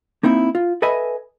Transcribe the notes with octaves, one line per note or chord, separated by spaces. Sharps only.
A#3 C4 D#4 E4
F4
A4 B4 D#5 E5 G#5 B5